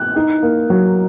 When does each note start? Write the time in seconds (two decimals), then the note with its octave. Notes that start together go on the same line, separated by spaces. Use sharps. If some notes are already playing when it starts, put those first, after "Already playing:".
Already playing: F#6
0.16 D#4
0.43 A#3
0.70 F#3